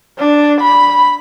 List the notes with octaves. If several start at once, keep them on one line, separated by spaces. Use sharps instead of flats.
D4
B5